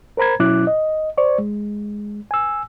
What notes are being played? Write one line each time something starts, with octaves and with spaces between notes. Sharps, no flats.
A#4 C5 A#5 B5 G#6
B2 F#3 C#4 E4 D6 F#6
D#5
C5 D5 C#6
G#3
G#5 E6